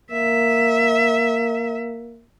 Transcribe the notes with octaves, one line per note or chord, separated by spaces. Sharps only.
A#3 E5